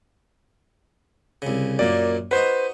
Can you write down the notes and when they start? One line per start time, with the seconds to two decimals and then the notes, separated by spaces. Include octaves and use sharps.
1.42 C2 C#3
1.79 F#2 A#2 A#3 D5
2.31 D#4 F#4 B4 C5